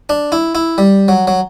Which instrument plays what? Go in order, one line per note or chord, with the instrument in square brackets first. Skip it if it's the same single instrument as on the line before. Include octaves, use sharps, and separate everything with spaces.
[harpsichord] D4
E4
E4
G3
F#3
F#3